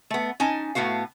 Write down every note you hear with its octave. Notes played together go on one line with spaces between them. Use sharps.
A3 B3
C#4 D#4 G#5 A5
A2 A3 B3 F#4 F5